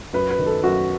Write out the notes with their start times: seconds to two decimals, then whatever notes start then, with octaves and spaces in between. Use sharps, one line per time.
0.13 F#2 B4
0.30 B4
0.39 D#3
0.46 A4
0.63 F#2 F#4